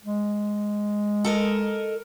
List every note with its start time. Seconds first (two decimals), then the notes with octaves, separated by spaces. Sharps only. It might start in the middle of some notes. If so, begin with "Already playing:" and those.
0.04 G#3
1.25 A4 A#4 D#5